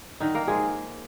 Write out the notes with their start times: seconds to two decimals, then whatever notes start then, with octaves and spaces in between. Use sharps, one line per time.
0.20 D3 D#3 D#4
0.34 A#3 A#4
0.47 F3 G#3 G#4